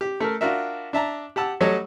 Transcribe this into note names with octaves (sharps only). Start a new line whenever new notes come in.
G4
A3 A4 A#4
D4 F4 F#4 A#4 E5
D4 E5 A5 A#5
G4 F#5 A5 E6
F#3 G3 A3 A4 C#5 D#5